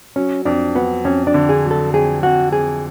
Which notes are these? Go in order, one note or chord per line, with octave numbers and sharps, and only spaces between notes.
F#3 C#4
F2 D4
F#3 B3
F2 C#4
D4
D3
G#4
F#3
A4
F2 G#4
F2 F#4
F2 G#4